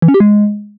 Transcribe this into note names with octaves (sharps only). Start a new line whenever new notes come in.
E3
C#4
G4
G#3